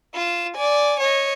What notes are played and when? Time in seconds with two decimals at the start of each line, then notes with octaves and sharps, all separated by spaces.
0.15 F4 E7
0.55 D5 G#5
1.00 C#5 D#5